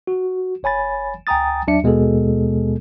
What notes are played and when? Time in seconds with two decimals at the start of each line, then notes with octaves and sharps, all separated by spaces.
0.07 F#4
0.63 G1 C#5 G#5 B5 A6
1.27 C#2 G5 G#5 A#5 D#6 A6
1.67 D#2 F#3 D4 E5 C#7
1.83 D#2 B2 G#3 B3 G#4 A4